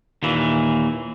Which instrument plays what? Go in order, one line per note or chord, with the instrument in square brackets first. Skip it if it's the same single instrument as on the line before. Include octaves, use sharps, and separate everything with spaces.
[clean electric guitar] D#2 A#2 E3